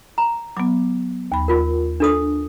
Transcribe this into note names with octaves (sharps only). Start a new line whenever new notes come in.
A#5
F#3 B3 D6
D#2 B5
F4 A#4
D4 A4 D#6